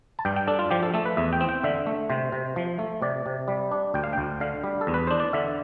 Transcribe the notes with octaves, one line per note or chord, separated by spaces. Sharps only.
A5
G2 G5
G5
D4 A4
F4
F3 G4
A4
A3 A4
B4
E2 E5
G5
C4
G5
D3 E5
A3
C3 C5
C3
F3
A3
C3 D5
C3
G3
D4
D2 G5
F5
D2 G5
D3 F5
G3
A4
E2
B4
D4 C5
D5
D3 E5